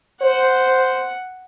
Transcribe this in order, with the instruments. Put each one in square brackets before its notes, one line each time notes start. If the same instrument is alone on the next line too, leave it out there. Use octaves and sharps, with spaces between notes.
[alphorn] C5 [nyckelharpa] F#5